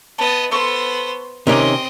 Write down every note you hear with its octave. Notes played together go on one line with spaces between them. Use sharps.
B3 D#5 A5
B3 A4 C5 C6 C#6
C3 D#3 C4 C#4 D#5 A#5 D6